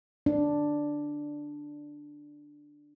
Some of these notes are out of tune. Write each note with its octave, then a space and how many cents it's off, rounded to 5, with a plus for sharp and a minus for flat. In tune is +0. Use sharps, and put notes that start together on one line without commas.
D4 +0